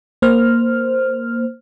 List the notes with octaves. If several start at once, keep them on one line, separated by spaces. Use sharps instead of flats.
A#3 C5 F6